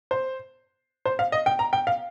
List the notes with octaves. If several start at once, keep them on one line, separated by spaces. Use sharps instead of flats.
C5
C5
F5
D#5
G5
A#5
G5
F5